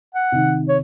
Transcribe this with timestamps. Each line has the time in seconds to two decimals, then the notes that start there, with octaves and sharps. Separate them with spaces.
0.15 F#5
0.32 C3 D#3
0.69 C#5